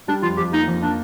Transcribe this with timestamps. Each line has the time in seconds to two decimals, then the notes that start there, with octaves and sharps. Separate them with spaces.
0.08 G3 D4
0.23 F2 F4
0.37 F2 G4
0.53 A#3 D#4
0.68 F2
0.82 A#3 D4